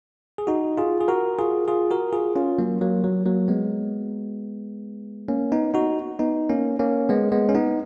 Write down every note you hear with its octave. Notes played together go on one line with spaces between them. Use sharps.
G#4
D#4 F#4
F4 G#4
G#4
F#4 A#4
F4 G#4
F4 G#4
F#4 A#4
F4 G#4
C#4 F4
F#3 A#3
F#3 A#3
F#3
F#3 A#3
G#3 B3
A#3 C#4
B3 D#4
D#4 F#4
B3 D#4
A#3 C#4
A#3 C#4
G#3 B3
G#3 B3
C#4
B3 D#4